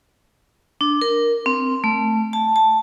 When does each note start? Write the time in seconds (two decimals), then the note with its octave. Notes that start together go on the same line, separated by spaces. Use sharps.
0.81 D4
1.02 A#4
1.46 C4
1.84 A3
2.33 A5
2.56 A5